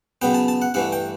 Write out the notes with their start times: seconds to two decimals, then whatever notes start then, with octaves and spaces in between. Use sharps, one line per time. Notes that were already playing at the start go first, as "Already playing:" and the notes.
0.22 C#3 F#3 B3 G5
0.35 A5
0.48 A5
0.62 F#5
0.74 G2 E3 A3 F#5
0.92 G5